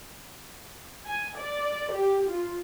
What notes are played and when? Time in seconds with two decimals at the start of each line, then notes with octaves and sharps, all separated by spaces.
1.06 G#5
1.37 D5
1.92 G4
2.29 F4